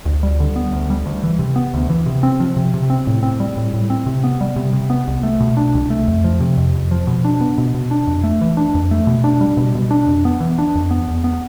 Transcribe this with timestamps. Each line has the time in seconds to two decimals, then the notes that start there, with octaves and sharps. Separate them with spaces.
0.05 D2
0.23 G3
0.40 D3
0.56 B3
0.72 D2
0.90 G3
1.06 D2
1.23 E3
1.39 C3
1.56 B3
1.74 D2
1.90 E3
2.06 C3
2.23 C4
2.40 F3
2.57 C3
2.74 C3
2.90 C4
3.07 A2
3.23 C4
3.40 G3
3.57 A2
3.73 A2
3.90 C4
4.06 C3
4.24 B3
4.41 G3
4.56 C3
4.73 C3
4.90 B3
5.08 C2
5.23 A3
5.40 B2
5.57 D4
5.74 C2
5.90 A3
6.08 F2
6.24 F3
6.40 C3
6.58 F2
6.74 F2
6.91 F3
7.07 B2
7.25 D4
7.41 B3
7.58 B2
7.74 B2
7.91 D4
8.07 F2
8.24 A3
8.41 E3
8.57 D4
8.75 F2
8.91 A3
9.07 B2
9.24 D4
9.41 G3
9.57 B2
9.75 B2
9.91 D4
10.07 F2
10.25 B3
10.41 E3
10.58 D4
10.75 F2
10.91 B3
11.08 E2
11.24 B3